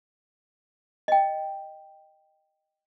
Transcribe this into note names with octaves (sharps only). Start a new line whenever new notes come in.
D#5 G5